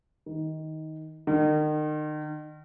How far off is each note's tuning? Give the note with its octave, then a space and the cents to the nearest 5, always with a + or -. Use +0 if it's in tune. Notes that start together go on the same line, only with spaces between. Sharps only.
D#3 +15
D#3 -35